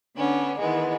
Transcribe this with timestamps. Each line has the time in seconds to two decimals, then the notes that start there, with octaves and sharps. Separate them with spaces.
0.16 D3 B3 C#4 D4
0.59 D#3 E3 G#3 B3